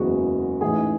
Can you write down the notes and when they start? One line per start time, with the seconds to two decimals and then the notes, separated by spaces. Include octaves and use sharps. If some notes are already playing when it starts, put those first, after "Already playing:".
Already playing: F#1 E2 C#3 G#3 F#4
0.61 A1 G#2 E3 G#4